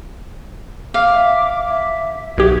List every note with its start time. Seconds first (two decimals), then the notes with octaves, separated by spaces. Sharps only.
0.94 F5 D6
1.10 E5
1.68 E5
2.38 B1 F#4 G4 G#6